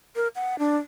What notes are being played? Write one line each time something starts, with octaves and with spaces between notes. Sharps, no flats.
A#4
F#5
D4